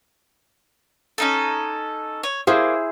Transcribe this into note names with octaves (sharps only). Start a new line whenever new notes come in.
C#4 D#4 A4
C#5
A#3 E4 G#4 C5